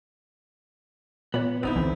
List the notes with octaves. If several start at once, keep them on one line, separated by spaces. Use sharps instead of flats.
A#2 B3 C#5
G1 B3 C4 D#4 E4
C#2 D3 E3